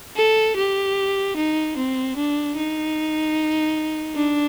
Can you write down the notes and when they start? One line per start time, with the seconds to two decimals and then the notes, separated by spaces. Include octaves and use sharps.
0.16 A4
0.57 G4
1.37 D#4
1.77 C4
2.17 D4
2.57 D#4
4.15 D4